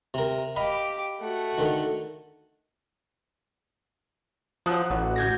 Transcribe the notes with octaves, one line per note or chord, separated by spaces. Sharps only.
C3 A#4
G4 D#5 F5 B5 D6
A3 F#4
D3 D#3
F3 F#3 A#5 D#6 E6 F#6
A1 F#4 C#5 D5
G6 G#6 A#6